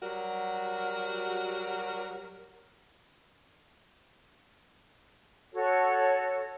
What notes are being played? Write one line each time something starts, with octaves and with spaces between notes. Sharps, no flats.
F#3 G3 F#4 A#4
F#4 A4 C#5